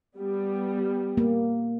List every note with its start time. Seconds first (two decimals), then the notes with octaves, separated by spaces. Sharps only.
0.16 G3 B3
1.17 A#3